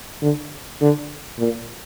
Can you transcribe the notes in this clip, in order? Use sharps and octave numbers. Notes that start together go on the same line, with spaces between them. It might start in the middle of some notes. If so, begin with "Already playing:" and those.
D3
D3
A#2